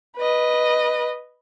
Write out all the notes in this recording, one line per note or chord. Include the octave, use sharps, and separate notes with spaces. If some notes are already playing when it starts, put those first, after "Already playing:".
B4 D#5